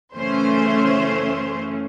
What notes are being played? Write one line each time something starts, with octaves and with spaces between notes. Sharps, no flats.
F#2 C#3 E3 A3 C#4 C5